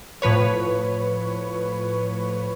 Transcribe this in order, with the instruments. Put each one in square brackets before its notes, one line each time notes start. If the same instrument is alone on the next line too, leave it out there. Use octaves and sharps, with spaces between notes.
[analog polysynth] A2 F3 B4 C#5